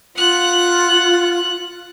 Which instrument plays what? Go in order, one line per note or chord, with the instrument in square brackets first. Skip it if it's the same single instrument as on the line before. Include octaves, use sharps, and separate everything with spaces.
[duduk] F4 [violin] F#5 F#6